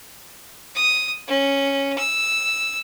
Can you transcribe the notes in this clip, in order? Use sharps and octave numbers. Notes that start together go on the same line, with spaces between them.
D#6
C#4
E6